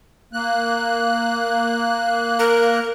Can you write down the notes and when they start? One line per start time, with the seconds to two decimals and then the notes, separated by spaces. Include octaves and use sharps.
0.33 A#3 F#6
2.39 A#4